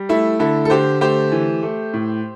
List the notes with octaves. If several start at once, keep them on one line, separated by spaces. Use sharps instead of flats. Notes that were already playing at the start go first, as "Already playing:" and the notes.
Already playing: G3
A3 E4
D3 E4 A4
A4
D3 G4 C5
A3 G4 C5
E3
A3
A2